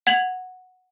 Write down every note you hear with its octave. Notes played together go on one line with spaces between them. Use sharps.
F#5 G#6 F7 F#7